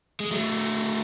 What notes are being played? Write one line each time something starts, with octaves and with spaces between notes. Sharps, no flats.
G#3
F#3 A3